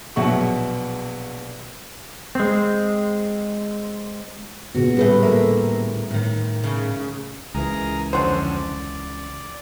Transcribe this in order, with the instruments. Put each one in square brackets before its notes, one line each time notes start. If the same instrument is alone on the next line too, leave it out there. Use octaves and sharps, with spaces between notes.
[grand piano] A#1 B2 F#3 E5 F#5 C#6
[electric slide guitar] G#3 C4
[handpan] A#2 C#3 B3 [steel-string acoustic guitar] F#4
[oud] D2 A2 A3 [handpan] G3 G#4 B4
[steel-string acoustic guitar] A#3 A#4 [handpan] E5
[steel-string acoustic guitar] A2 D#3
[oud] C#3
[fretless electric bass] C#2 E3 [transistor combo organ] G#4 A#4 A#5
[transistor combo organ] F2 D3 C#4 [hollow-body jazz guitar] C5 F#5
[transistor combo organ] D5